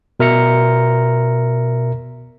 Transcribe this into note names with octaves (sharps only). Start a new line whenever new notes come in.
B2 A#4 E5 A#5 C#7